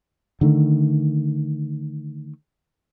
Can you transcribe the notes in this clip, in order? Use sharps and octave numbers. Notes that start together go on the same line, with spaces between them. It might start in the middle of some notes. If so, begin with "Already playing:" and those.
D3 D#3 A3